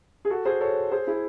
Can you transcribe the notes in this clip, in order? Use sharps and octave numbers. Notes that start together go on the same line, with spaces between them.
G#4
F#4 A4
G#4 C5
A4 C#5
G#4 C5
E4 G#4